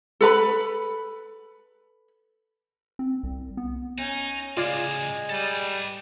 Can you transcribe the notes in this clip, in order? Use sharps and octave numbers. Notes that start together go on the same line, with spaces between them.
A4 B4 A#5 B5
C4
C2
B3
C#4 D#4
A2 C#3 G#3 F4 D5 F5
G3 A4 B4 A6